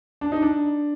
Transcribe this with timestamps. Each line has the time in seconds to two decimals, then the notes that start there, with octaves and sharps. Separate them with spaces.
0.21 D4
0.32 D#4
0.42 D4